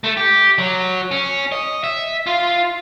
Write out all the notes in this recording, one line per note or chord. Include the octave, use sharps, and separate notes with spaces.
A3
G4
F#3
C#4
D#5
E5
F4